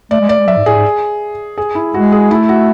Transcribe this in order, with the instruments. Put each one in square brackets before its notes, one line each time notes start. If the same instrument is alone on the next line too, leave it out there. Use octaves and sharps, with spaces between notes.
[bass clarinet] A3 [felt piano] D5
[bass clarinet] G#3
[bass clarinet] A3 [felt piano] D5
[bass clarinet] G#3
[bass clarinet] F#3 [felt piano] E5
[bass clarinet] G#2
[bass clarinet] A2 [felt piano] G#4
[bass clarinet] G#2
[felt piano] G#4
E4
[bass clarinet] G#3 [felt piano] F#4
[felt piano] G#4
[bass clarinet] A3 [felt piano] E4
[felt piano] F#4